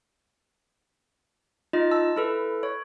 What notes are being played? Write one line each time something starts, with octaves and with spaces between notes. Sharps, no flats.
D#4 F4 D#5
A5 E6
E4 A4 B4
C#5